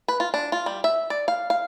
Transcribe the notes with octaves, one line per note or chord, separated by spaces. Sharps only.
B4
F4
D4
F4
G3
E5
D5
F5
F5